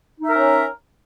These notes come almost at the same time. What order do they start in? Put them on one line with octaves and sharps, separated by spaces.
D#4 E5 A#4 C#4